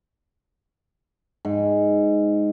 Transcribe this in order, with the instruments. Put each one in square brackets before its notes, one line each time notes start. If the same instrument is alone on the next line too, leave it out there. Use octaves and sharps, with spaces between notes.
[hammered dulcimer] G#2